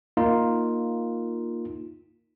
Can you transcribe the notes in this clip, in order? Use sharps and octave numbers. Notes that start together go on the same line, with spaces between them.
A#3 D#4 F4